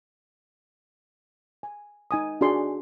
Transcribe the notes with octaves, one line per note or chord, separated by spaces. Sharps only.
G#5
D#4 G#5 D#6
D4 F#4 G#4 D5 C6